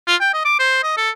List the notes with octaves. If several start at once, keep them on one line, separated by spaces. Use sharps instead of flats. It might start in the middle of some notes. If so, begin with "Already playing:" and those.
F4
G5
D#5
D6
C5
D#5
A4